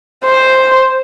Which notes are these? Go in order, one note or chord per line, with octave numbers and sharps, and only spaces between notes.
C5